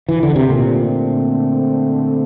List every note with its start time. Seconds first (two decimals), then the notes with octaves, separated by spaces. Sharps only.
0.09 E3
0.23 D3
0.36 C3
0.50 A#2 D3 A3 C4